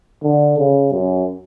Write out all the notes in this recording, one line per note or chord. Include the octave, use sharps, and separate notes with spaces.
D3
C#3
F#2